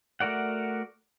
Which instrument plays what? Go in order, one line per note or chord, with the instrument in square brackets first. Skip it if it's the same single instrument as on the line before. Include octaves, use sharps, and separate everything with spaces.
[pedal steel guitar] A3 F#4 A#4 D5 F#5